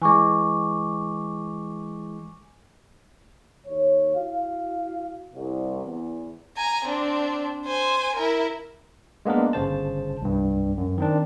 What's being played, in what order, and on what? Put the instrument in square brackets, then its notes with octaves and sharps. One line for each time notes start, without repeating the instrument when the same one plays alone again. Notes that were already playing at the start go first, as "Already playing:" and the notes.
[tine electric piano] E3 G#3 [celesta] G#5 C#6 D6
[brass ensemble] D#2 C#5
E4 F#4 F5
C2
E2
[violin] G#5 A#5
C4 D4
C5 G#5
E4 A#4
[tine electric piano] G#3 A#3 B3 D4 A#4
G1 C#3 C5 A5
C2 G2
F#2
D#3 C4 D4